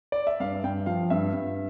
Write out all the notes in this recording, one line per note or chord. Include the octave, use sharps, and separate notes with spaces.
D5
E5
G2 F5
G2 G5
F3 F5
G2 E5
G2